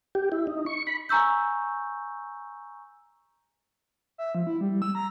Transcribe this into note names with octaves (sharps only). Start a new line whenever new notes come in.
G4
E4
D#4
C#6
B5
G#5 A#5 C#6 E6 G6
E5
F3
E4
G3
E6
A#5